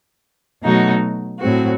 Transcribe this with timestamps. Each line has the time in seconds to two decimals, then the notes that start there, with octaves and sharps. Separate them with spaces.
0.62 B2 F#3 A3 D#4 F#4
1.40 A2 F#3 C4 F#4